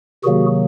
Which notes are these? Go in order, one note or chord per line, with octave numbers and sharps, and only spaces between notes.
C3 D#3 F#3 A#3 F#4 G#4